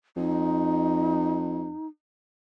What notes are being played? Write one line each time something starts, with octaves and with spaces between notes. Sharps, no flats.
F2 D#4